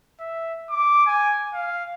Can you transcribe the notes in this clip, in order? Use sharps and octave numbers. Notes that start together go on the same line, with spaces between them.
E5
D6
G#5
F5